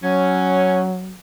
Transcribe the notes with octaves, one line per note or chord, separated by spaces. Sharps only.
F#3 C#4